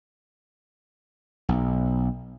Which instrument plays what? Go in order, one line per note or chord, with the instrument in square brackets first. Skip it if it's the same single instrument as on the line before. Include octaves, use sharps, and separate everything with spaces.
[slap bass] B1